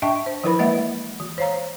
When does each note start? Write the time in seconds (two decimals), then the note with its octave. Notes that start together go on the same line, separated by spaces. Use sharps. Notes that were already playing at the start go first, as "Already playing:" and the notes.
0.02 D4 D#5 E5 G5 A5 C#6
0.26 C5
0.44 E3 F3 E4 A#4 B4 B5
0.59 G#3 A#3 D#5 E5 F#5
1.20 E3
1.38 C5 C#5 F5 A#5